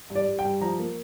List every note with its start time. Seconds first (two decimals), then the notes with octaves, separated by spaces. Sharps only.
0.10 G2
0.15 D5
0.27 G2
0.39 G5
0.44 G2
0.61 F3 A#5
0.79 A#3